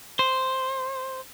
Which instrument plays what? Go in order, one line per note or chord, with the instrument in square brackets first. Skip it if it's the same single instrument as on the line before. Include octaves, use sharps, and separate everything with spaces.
[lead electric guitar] C5